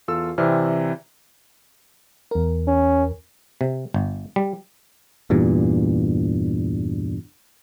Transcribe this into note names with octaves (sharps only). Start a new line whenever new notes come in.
E2 F4 A4 E6
C3 E3 C4 D5 E5 F6
E2 A#4
C#4
C3
G1
G3
E2 G2 A#2